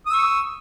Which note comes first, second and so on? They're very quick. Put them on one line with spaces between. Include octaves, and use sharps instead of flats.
D#6 E6 C#6